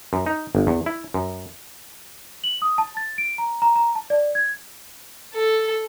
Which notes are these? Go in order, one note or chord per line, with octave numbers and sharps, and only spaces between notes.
F#2
D#4
G1
E2
E4
F#2
F#7
D#6
A5
A6
D7
A#5
A#5
A#5
A5
D5
G#6
A4